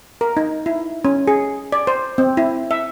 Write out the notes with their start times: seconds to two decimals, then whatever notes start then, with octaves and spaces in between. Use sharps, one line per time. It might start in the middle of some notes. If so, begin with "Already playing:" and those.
0.21 A#4
0.37 D#4
0.66 E4
1.05 C#4
1.27 G#4
1.72 D5
1.87 C5
2.18 C4
2.37 E4
2.71 E5